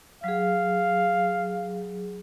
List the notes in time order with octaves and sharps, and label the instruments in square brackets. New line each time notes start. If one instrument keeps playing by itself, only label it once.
[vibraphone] F#3 G#4 [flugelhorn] F5